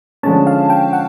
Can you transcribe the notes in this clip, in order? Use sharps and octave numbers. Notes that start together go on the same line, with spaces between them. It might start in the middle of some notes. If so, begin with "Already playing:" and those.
D3 F3 G#3 C#4 A5
F5
G5
F#5